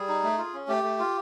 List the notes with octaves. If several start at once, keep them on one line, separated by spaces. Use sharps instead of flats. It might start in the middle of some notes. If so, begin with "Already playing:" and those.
Already playing: G3 G#4
D#4
A3
F4
C#4
A3 G4
A3
F4